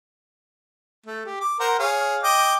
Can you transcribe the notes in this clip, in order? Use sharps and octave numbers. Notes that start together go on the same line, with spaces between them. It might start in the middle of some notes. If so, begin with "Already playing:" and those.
A3
G4
D6
A#4 C5 F#5
G#4 C#5 F5
D#5 G5 D6